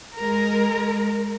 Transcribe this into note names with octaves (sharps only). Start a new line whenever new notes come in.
G#3 A#4